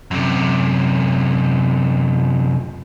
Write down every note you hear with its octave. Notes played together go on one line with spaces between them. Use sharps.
F#2 C3